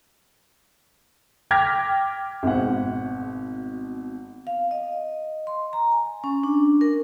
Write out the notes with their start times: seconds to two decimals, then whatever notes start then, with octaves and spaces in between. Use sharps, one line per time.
1.51 G5 D6 F6 G#6 A#6 B6
2.43 G#1 B2 C5 F#5
4.47 F5
4.71 D#5
5.47 C6
5.73 A#5
5.92 G#5
6.24 C#4
6.43 D4
6.81 A#4